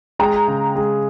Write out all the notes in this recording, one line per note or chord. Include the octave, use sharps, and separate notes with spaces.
G#3 G5 A#5
C#3
G#3